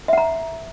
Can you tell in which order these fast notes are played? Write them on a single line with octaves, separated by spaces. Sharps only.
E5 F#5 A#5